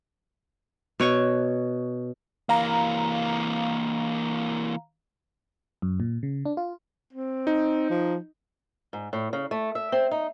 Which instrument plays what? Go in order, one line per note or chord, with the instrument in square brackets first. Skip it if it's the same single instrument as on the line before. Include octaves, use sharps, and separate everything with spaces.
[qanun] B2 C#5 C#6
[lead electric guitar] E3 A#3 [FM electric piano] F5 A#5
[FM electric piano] F#2
A#2
C#3
D4
F4
[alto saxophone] C4
[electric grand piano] D#4
[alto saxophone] F3
[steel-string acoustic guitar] G#2
A2
C#3
A3
E5
C4
D#4